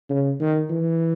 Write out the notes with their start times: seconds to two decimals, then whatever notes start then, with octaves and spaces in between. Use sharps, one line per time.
0.09 C#3
0.40 D#3
0.69 E3